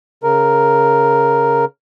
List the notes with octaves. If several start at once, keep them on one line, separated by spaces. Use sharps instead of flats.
C#3 A#4